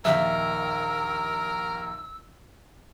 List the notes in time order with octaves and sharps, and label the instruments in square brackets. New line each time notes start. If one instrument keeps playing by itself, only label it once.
[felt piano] A#1 D#2 D#3 [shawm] A#4 [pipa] E5 [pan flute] E6